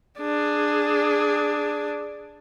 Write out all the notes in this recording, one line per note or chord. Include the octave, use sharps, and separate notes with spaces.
D4 G#4